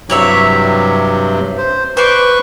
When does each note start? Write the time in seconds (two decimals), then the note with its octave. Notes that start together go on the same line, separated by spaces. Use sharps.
0.10 G2 C3 F#3 E4 C#5 E5
1.58 C5
1.97 B4 C5 D5 C#6